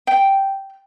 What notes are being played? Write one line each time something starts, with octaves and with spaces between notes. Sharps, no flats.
G5